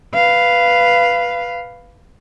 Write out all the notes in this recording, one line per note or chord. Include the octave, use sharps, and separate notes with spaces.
B4 F5